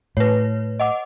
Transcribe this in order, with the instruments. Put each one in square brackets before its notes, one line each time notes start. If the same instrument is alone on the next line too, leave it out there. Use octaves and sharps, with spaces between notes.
[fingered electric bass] A2 [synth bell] B4 C#5
[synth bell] D#5 F#5 D6